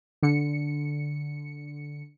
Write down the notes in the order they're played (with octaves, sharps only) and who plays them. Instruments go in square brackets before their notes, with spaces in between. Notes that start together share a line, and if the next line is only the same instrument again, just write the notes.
[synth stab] D3 C#7